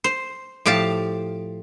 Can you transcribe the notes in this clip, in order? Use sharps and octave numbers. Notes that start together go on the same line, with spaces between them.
C5
A2 F3 G4 F5 A5